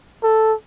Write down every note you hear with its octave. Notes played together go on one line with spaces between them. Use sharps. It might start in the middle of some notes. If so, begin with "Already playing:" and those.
A4